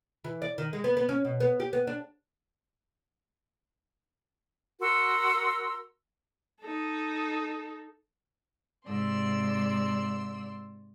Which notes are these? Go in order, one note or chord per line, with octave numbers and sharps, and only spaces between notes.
E3
D5
D#3
G#3
B3
B3
C#4
B2
B3
G4
B3
D4
F#4 A#4 C6 E6
D#4 A4
G#2 C3 D5 C6 E6